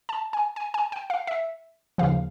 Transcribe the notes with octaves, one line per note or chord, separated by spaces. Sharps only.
A5
G#5
G#5
G#5
G5
F5
E5
D#2 C#3 F3 F5